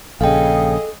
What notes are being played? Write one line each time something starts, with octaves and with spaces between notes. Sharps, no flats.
A#1 C#3 G#4 A4 D#5 F5 G5